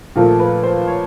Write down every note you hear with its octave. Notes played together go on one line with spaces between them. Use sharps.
A#2 F3 A3 A#4
B4
C5
C#5